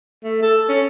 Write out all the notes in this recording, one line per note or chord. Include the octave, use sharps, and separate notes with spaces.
A3
A4
C#4